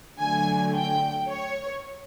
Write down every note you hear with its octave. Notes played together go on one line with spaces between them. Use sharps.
D3 F#3 A3 G#5
G5
C#5